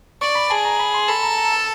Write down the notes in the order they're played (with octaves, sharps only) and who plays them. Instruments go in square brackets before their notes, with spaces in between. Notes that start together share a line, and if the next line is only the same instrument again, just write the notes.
[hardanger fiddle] D5 [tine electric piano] C#6
[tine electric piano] B5
[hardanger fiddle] G#4 [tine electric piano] A5
[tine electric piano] A#5
B5
C6
[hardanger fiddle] A4 [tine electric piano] B5
[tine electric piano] A#5
A#5
A5